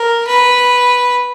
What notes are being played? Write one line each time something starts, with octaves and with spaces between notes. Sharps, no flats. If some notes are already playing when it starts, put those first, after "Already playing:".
Already playing: A#4
B4